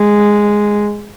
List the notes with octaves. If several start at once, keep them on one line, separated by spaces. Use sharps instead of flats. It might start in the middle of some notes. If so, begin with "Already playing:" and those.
Already playing: G#3